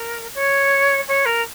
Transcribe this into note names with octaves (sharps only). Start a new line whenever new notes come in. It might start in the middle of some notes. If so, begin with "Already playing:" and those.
Already playing: A#4
C#5
C#5
A#4